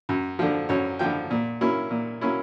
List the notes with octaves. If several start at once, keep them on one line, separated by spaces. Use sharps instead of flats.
F#2
D3 F3
F#2 C#5
D3 F3 G5
A#2
F#3 A#3 C#4 E4
A#2
F#3 A#3 C#4 E4